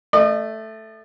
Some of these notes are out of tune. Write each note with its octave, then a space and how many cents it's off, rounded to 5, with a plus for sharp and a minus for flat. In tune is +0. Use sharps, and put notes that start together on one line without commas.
A3 +0 D#5 -40